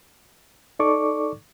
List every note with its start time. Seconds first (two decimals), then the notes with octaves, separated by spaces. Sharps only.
0.79 D#4 A4 D5 C#6 D6